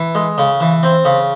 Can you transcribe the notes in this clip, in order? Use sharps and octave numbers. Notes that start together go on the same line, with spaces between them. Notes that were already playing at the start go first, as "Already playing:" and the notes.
Already playing: E3
G#3
C#3
E3
C4
C#3